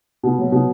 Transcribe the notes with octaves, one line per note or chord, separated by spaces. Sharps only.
B2
F#3
B2